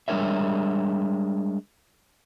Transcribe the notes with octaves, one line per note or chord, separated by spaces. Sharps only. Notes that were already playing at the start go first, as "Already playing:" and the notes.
G3 G#3 D4 A#4 C#5 E5